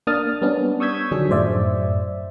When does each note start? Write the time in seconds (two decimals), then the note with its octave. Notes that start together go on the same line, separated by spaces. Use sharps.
0.07 A#3 D4 D#6 F6 A6
0.41 G3 B3 C#4 D4
0.80 C#6 D#6 E6 G6 G#6 B6
1.11 D3 D#3 F3 F#3 D4 G#4
1.29 F#2 A2 C5 D5 E5